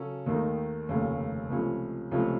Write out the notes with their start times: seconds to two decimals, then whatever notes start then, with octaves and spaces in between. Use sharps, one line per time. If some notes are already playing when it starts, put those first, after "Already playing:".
Already playing: C#3 F#3 C#4 A4
0.26 D#2 D#3 A3 D#4
0.89 F1 D#2 C#3 A3 C#4
1.50 C#2 C3 F3 A3 C#4
2.11 C#2 C3 F3 A3 C#4